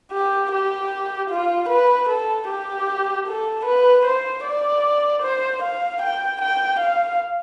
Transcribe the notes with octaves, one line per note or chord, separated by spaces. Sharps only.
G4
G4
F4
B4
A4
G4
A4
B4
C5
D5
C5
F5
G5
G5
F5